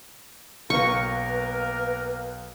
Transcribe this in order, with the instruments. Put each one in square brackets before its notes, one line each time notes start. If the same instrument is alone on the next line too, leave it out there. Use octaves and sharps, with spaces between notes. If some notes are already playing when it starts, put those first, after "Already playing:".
[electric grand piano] B1 F5 [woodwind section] A#3 A#4 [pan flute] B4 [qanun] C#6